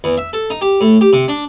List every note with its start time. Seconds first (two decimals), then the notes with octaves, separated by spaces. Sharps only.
0.04 E2
0.17 E5
0.33 A4
0.50 D#4
0.61 G4
0.81 A2
1.01 G4
1.13 C3
1.28 D4